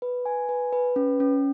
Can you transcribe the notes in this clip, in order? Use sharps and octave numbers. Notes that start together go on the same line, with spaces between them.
B4
G#5
B4
B4
C#4
C#4